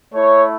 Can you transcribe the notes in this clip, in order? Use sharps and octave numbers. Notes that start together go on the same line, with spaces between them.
A3 E4 C#5